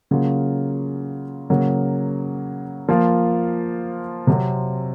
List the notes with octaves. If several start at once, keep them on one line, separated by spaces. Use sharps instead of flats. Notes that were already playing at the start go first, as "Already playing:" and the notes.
C#3 F#3 A#3 C#4 F4
C#3 F#3 A#3
F3 A#3 F4
C3 F#3 C4